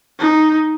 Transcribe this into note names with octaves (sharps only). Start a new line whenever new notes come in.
D#4